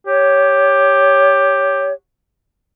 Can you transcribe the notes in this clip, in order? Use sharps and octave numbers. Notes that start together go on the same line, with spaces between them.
G4 C#5